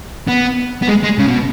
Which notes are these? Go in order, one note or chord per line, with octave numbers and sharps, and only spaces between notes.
B3
B3
G#3
G#3
C#3
B2